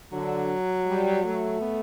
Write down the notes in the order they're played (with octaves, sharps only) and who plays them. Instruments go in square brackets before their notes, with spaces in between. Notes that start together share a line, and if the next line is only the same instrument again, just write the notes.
[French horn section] D3 [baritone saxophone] F#3
[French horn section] G3
A3
[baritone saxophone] B3